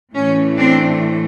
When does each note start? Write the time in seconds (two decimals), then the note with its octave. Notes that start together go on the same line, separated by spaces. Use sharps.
0.13 A2 E3 A3 C#4
0.57 C4 D4